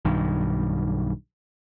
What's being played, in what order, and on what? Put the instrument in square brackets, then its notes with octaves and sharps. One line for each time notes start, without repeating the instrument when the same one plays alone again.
[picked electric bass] B1 G2 D#3